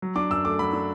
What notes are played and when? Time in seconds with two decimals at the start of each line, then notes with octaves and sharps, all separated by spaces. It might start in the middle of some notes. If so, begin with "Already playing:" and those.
0.02 F#3
0.16 D4 D6
0.30 F#2 E6
0.44 A3 D6
0.59 F#3 B5
0.73 D4